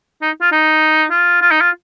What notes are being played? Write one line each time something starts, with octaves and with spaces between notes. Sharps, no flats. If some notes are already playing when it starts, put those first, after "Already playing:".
D#4
F4
D#4
F4
F4
D#4
F4